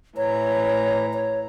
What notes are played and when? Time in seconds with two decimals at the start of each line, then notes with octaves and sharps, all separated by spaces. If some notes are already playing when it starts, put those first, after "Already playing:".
0.17 A2 E3 C#5 A#5
1.13 C#5